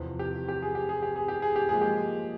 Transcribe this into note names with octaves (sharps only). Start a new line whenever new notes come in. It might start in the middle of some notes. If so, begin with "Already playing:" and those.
Already playing: E2 C3 F3 C4
G4
G4
G#4
G4
G#4
G4
G#4
G4
G#4
G4
A#2 F3 G#3 G#4
G4